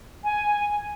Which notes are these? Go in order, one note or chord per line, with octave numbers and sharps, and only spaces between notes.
G#5